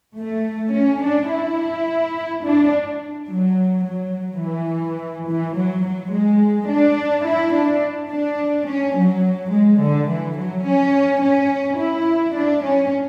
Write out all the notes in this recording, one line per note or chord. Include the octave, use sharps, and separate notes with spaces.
A3
C#4
D4
E4
D4
F#3
F#3
E3
E3
F#3
F#3
G#3
D4
E4
D4
D4
C#4
F#3
G#3
D3
E3
F#3
C#4
C#4
E4
D4
C#4